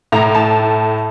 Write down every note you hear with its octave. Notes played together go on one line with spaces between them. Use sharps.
A2 A#5
A5